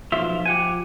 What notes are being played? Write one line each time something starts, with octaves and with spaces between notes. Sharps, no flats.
B1 F3 F4 E5
G4 F#5 G#5